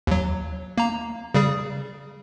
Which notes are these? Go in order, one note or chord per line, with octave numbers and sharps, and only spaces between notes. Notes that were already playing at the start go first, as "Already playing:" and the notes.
D#2 F#3
A#3 A#5
C#3 G3 G#4